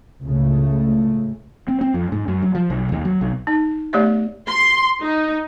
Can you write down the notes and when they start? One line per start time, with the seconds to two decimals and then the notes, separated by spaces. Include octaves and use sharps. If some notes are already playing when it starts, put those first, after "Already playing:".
0.24 C#2 A2 C#3 A3
1.68 C4
1.81 C4
1.94 F2
2.12 G#2
2.28 F#2
2.42 F#3
2.55 F3
2.70 B1
2.92 D#2
3.05 F#3
3.21 B1
3.47 D#4
3.93 A3 B3 G4 C#5 D5 E5
4.47 C6
5.01 D#4